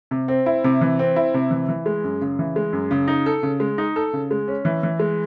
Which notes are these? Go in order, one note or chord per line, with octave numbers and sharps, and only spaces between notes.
C3
C4
E4
C3
E3
C4
E4
C3
E3
E3
G#3
F#2
C#3
E3
G#3
F#2
C#3
D#4
A4
C#3
G#3
D#4
A4
C#3
G#3
C#4
E3
E3
G#3